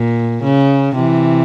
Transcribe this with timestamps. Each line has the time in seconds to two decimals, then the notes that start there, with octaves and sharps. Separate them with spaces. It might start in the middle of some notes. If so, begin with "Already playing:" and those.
Already playing: A#2
0.43 C#3
0.95 C3 E3